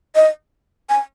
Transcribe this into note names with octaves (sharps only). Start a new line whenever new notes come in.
D#5
G#5